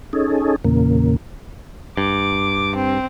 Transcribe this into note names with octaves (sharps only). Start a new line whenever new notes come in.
C#4 D#4 G#4 A4
E2 A#2 C#3 A#3
G2 D6
C4